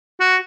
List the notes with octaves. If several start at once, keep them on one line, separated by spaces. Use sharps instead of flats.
F#4